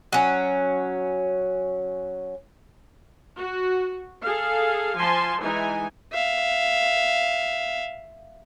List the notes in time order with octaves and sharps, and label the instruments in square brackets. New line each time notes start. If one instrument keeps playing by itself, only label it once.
[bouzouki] F#3 C#4
[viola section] F#4
G#4 A4 F5
F3 G#5 A5 C6
E3 G#3 D#4 G#5
[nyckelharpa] E5 F5